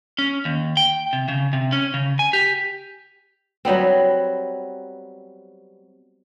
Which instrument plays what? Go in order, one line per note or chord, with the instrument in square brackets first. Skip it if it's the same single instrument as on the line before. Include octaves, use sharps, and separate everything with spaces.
[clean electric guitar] C#4
D#2
G5
C3
C#3
C3
C#4
C#3
G#5
G4
[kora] F#3 G3 B3 C4